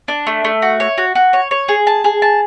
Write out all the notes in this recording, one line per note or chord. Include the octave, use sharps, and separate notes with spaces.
D4
A3
A3
F#4
C#5
F#4
F#4
C#5
C#5
G#4
A5
G#4
A5